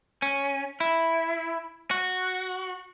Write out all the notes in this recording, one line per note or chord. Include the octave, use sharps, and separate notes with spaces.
C#4
E4
F#4